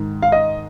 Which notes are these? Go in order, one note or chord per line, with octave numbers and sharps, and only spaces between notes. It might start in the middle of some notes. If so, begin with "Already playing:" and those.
Already playing: G#2 D#3
F5
D#5